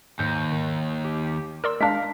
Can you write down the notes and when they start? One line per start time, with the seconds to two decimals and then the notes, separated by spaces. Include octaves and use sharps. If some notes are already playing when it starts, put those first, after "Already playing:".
0.19 D#2 G#2 G6
0.52 D#3
1.04 G4
1.64 A#4 D5 C6 E6
1.81 G#3 D4 A#4 F5 B6